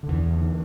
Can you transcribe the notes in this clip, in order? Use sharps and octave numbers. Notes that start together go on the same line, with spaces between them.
D3
E2 E3
D3